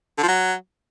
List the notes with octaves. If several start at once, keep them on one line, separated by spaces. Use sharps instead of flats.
D3
F3
F#3